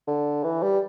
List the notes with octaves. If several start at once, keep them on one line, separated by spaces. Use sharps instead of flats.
D3
E3
G3